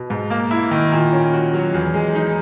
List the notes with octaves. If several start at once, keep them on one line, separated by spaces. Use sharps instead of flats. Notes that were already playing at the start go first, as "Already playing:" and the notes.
Already playing: B2
G#2
A#3
E4
D#3
A#2
C#4
F#4
F#3
E2
G#3
D#4